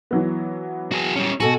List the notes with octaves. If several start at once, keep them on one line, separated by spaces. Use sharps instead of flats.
E3 F#3 B3
F#4 G#4
G3 C#4
B2 F#4 A4 G#5